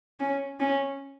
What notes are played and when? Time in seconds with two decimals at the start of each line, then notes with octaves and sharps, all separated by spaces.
0.20 C#4
0.60 C#4